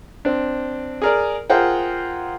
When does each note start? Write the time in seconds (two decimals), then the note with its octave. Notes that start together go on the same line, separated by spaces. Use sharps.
0.25 C4 D4
1.02 G#4 A#4 D5
1.50 F4 G#4 A#4 C5 F#5 G5